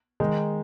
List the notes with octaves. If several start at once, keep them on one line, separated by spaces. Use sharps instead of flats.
D#3 G#3 D#4